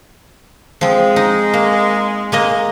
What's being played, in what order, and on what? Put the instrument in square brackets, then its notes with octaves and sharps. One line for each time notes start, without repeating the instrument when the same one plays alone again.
[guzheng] F3 C4 [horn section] G#3
[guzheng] D#4
A#3
G#3 A#3 D#5